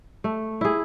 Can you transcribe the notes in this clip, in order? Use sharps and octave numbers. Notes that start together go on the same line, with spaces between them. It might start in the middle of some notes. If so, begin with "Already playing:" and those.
A3
E4 G#4